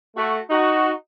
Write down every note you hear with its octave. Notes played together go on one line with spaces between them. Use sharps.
A3 F#4
D#4 F#4